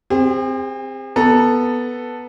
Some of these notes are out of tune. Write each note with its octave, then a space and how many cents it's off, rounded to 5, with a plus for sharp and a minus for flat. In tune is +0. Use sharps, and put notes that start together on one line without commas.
C4 +0 G#4 -45
B3 -5 A4 +0 A#5 +20